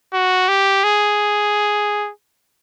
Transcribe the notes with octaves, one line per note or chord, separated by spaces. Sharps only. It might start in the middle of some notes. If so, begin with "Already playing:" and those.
F#4
G4
G#4